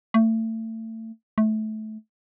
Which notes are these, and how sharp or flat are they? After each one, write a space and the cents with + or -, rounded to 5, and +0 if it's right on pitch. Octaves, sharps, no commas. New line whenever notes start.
A3 +30
A3 -20